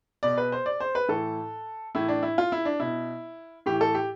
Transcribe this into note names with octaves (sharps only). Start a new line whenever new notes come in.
B2 D5
B4
C5
D5
C5
B4
A2 E3 A4
A2 E3 E4
D4
E4
F4
E4
D4
B2 E4
A2 E3 G4
A4
G4